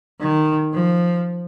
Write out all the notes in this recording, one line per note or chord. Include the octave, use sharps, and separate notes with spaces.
D#3
F3